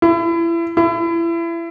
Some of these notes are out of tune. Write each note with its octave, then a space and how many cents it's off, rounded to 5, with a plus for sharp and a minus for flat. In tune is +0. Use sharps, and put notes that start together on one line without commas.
E4 +30
E4 +30